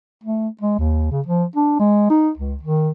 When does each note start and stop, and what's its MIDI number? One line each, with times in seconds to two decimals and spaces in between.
0.24 0.48 57
0.61 0.75 56
0.78 1.08 39
1.11 1.21 49
1.26 1.45 53
1.56 1.75 62
1.80 2.07 56
2.10 2.30 63
2.37 2.56 37
2.63 2.90 51